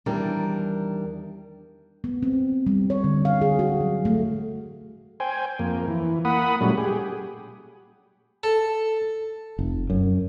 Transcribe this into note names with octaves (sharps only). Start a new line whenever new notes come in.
E2 D#3 G3 D4 A#4
B3
C4
G3
C#5
D3
F5
G#4
F#4
F#3
A3
C5 G5 G#5
F2 A#3
E3
A#3 F#5 B5 D#6
A#2 F#3 G3 A3 C#4
G4 G#4
A4
F1
F#2